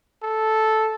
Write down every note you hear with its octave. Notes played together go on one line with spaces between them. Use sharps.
A4